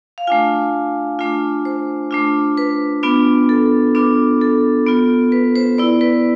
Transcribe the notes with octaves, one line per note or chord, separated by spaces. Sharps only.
F5
A3 D4 F4 G#5
A3 D4 F4
C5
A3 D4 F4
B4
B3 D4 F4
A4
B3 D4 F4
A4
B3 F4
B4
C5
B3 E4 D5
B4